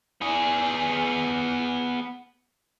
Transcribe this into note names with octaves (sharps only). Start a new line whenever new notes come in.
B3 G#4